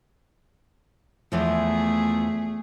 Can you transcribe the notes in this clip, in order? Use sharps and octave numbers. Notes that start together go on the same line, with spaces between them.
E2 E3 F3 A3 G#4